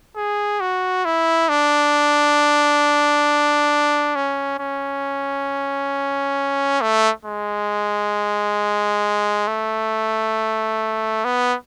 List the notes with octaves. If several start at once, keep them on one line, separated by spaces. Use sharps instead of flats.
G#4
F#4
E4
D4
C#4
C#4
A3
G#3
A3
B3